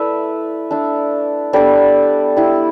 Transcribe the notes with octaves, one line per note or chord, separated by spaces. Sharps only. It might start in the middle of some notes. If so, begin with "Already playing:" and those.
Already playing: A3 E4 B4 D5 E5
A3 D4
G3 B3 D4 A4 D5
G3 E4